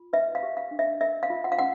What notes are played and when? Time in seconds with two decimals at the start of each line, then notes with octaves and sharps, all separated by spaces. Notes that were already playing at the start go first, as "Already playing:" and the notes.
Already playing: F4
0.13 B4 E5
0.35 F5
0.43 G4
0.57 F5
0.71 D4
0.79 E5
1.01 A#4 E5
1.23 F5
1.30 F4
1.44 F#5
1.52 F5
1.59 C#4 F#5